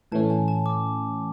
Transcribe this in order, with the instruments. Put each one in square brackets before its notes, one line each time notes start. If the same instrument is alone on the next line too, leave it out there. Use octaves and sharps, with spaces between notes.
[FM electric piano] A2 E3 A3 C#4 [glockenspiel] A5
[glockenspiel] G#5
A5
D6